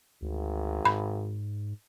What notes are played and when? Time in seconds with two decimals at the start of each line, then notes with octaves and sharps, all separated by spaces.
0.22 G#1 D2
0.85 G#2 B5